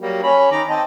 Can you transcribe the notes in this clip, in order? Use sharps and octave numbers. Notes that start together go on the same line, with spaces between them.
F#3 G3 A#3
C#4 C#5 B5
D#3 A#5 D6
C4 D#5 A5